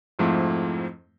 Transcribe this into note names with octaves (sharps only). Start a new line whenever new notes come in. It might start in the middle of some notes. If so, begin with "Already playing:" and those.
F2 G#2 F3 A3 C4 E4